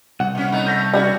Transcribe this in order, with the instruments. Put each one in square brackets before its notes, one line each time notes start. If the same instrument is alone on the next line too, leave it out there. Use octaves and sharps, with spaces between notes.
[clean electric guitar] C2 [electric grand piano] F#5
[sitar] A#2 C#4
A3 B3 D#4
[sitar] A3 [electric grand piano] G6 A#6 B6
[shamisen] G3 C4 E4 [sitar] C#4 F#4